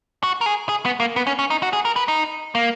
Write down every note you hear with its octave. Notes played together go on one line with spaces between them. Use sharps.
F#4
A#4
G#4
G#4
B3
A#3
B3
C#4
C#4
D#4
F#4
G#4
A#4
B4
D#4
A#3